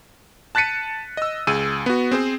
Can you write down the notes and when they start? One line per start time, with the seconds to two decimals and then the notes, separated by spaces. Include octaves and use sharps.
0.55 A5 F#6 A6 B6 C#7 D#7
1.17 D#5 E6
1.47 C#2 G#4 E6 D#7
1.86 B3 F#4
2.11 C4 G#4 C5